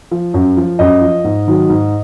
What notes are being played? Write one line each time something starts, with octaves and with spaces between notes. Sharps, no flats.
F3
F#2
F3
F#2 D#5
F3
G#2
D#3 F#3
G#2